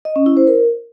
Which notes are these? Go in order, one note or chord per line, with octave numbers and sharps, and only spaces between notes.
D#5
C#4
E4
C5
A#4